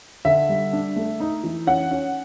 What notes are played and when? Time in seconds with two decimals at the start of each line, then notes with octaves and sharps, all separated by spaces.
0.25 D3 E5
0.49 G3
0.73 D4
0.96 A3
1.20 D#4
1.44 E3
1.67 C#4 F#5
1.91 C#4